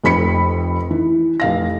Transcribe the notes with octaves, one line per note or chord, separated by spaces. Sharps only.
F1 F2 B5 B6 C#7
E3
F1 F5 A#6